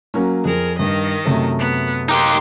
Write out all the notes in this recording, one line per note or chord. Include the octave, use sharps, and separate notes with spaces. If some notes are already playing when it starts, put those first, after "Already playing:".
F#3 A#3 C#4
F2 G#4 A#4
G2 D#3 D#5
F#2 C3 A3
B3
D#4 G4 A#4 C6